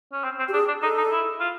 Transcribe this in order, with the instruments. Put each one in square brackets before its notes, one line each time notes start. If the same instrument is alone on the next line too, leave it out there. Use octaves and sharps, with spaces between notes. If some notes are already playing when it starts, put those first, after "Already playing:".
[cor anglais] C#4
C4
C4
[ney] G4
[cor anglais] D4 [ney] G#4
[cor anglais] D4
[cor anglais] D#4 [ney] A4
[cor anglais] D#4
E4
F4